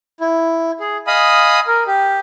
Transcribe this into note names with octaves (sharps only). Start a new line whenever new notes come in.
E4
G#4
D#5 F5 G#5 B5 D#6
A#4
G4